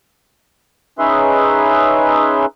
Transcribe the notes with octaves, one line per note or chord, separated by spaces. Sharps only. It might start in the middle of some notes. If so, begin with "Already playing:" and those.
C#4 D#4 G#4 B4 E5 C6